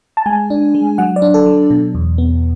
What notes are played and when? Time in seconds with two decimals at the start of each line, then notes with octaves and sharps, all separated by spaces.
0.17 A5
0.26 G#3 G#5
0.50 D4
0.75 G#3
0.98 F#3 F#5
1.16 D5
1.22 D4
1.34 A4
1.46 F#3
1.70 B2
1.95 E2
2.18 B3